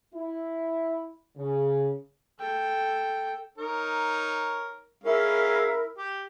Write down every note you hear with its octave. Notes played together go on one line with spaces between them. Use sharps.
E4
C#3
A4 G5
D#4 A#4 C#5
G#3 C#4 E4 A#4 F5
G4